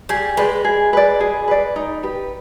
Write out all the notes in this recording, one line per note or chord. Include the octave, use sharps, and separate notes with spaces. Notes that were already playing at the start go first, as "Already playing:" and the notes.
G3 G#4
G#3 B4 D5
G#4
B4 D5
G#4
B4 D5
D#4
G4 B4